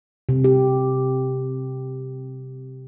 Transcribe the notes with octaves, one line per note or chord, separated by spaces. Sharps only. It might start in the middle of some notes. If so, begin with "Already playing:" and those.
C3
G4